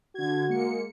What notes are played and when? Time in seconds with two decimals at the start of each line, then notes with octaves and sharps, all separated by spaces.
0.15 D3 F#4 G#6
0.49 G#3 A#3 C#7